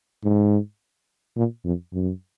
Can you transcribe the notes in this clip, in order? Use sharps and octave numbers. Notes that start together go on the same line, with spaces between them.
G#2
A#2
F2
F#2